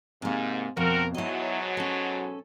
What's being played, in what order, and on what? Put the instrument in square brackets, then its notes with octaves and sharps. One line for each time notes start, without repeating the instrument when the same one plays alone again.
[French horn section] G#2 [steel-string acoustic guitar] C3 A#3
[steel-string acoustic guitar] F2 B2 [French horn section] C4 F#4 A#4
[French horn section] G#2 B2 F#3 [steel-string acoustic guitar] E4 D#5
[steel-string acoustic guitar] C#4 A4